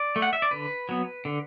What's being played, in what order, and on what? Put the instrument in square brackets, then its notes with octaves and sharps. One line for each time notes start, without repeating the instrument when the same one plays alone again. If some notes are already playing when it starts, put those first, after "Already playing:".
Already playing: [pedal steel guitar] D5
A3
F#5
E5
D5
D3 B4
F#3 B3
D3